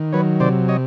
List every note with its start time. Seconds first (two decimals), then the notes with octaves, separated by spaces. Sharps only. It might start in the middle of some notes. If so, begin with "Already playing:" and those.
Already playing: D#3
0.13 F#3 B4 C#5
0.40 C3 C5 D5
0.68 C#5 D#5